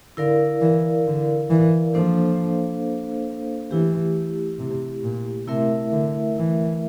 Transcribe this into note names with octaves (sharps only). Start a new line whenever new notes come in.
D3 E4 A#4 D5 F5
E3
D3
E3
F3 A#3 D4 A4 C5 F5
E3 A3 E4 G4
C3
A#2
C3 A3 E4 A#4 E5
D3
E3